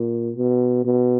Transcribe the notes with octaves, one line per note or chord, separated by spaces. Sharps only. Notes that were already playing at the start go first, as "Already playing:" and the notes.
Already playing: A#2
B2
B2